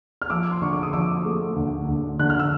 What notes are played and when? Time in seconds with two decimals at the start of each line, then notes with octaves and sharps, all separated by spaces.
0.22 F6
0.30 F3 D6 E6
0.51 C6
0.62 D3 C#6
0.73 D6
0.83 D#6
0.93 F3 D6 E6
1.25 A3
1.56 D2
1.88 D2
2.19 D3 F#6
2.30 F6
2.39 E6